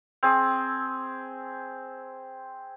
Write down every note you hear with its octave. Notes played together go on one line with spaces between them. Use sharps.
C4 G#4